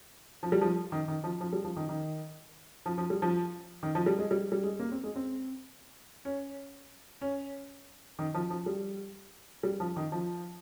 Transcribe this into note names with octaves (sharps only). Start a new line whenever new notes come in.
F3
G3
F3
D#3
D#3
F3
F3
G3
F3
D#3
D#3
F3
F3
G3
F3
D#3
F3
G3
G#3
G3
G3
G#3
A#3
C4
G#3
C4
C#4
C#4
D#3
F3
F3
G3
G3
F3
D#3
F3